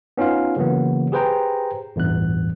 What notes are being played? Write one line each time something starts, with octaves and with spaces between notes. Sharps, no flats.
B3 C#4 D#4 F4 F5
C#3 E3 F#3 A#3 B3
G4 G#4 B4 C5 G5 A#5
A1 E2 G2 F#6